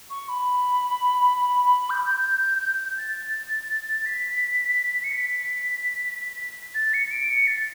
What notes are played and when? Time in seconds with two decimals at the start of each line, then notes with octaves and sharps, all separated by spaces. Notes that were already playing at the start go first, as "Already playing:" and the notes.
0.10 C#6
0.29 B5
1.90 G6
2.98 A6
4.06 B6
5.04 C#7
5.13 B6
6.75 A6
6.93 C#7
7.11 D7
7.30 C#7
7.47 A6